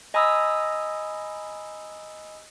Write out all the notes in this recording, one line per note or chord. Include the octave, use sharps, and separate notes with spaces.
D#5 G#5 A#5 B5 D#6 E6